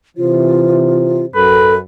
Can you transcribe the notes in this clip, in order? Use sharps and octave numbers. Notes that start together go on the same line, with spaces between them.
C3 E3 F4 C5
F#2 A4 B4